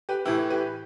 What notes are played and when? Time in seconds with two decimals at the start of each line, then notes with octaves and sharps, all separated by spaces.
0.09 G4 B4
0.25 A2 E3 E4 G4
0.50 G4 B4